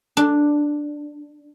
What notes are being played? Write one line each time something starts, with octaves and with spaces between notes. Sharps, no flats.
D4